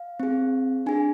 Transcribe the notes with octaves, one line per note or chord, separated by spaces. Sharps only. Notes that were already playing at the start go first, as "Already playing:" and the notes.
Already playing: F5
C4 G#4
D4 G#4 G#5